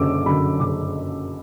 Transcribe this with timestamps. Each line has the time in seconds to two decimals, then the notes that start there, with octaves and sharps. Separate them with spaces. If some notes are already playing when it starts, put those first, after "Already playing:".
Already playing: F#1 F#2 D3 D6 E6
0.26 F#2 D3 B5
0.59 F#1 D6